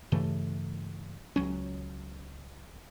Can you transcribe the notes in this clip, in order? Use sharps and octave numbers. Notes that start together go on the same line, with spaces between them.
G2 C#3 E3 A3
C#2 F#3 C#4